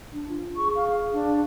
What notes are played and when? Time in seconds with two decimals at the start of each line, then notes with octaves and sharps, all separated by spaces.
0.13 D4
0.29 F4
0.57 G#4 C#6
0.76 F5
1.13 D4